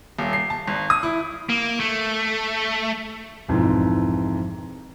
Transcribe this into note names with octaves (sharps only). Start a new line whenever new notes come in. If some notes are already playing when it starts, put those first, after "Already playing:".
D#1
C7
A5
G#1
D#6
E4
A#3
A3
B1 F2 G#2 E3 E4